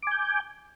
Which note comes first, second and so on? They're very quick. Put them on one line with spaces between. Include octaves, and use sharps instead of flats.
D6 G#5 G6